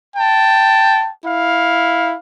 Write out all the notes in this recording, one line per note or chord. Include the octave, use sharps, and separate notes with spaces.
G5 A5
E4 F5